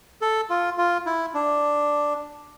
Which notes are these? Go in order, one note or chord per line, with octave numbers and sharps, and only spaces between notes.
A4
F4
F4
E4
D4